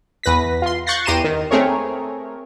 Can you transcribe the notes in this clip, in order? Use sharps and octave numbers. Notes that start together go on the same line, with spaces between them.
E2 B4 A#6 B6
F4 C6
C#6 F#6 G6 A6 A#6 C7
E2 G4 A#5 C6 D#7 E7
D#3
A3 C4 G#4 A#4 C#5